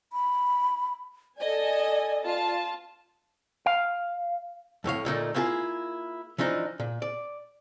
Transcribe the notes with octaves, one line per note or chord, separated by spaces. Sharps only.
B5
A4 D5 D#5 G#5
F4 A5
F5
F2 A2 C#5 F5
D2 A#2 A3 D#4
A#3 E4 F4 G4 G#4
E3 F3 D4 D#4
A#2
D5